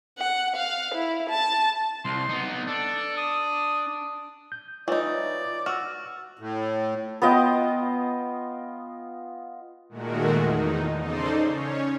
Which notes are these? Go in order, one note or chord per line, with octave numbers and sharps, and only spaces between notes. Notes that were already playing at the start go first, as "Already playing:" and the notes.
F#5
F5
E4
A5
C2 C6
B3 D#4
D4 A4
D#6
G6
E3 D#4 F4 C#5 D5
F#4 E6 F6
A2
B3 F4 D#5 G5
A#2 D#3 G#3 A3 F#4 A#4
E2 D#4
C#3 D#4 A4 C5 D5 C6
C#4 C#5